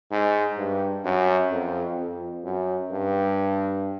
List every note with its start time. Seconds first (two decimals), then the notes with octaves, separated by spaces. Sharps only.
0.12 G#2
0.58 G2
1.05 F#2
1.51 F2
1.97 F2
2.44 F#2
2.91 G2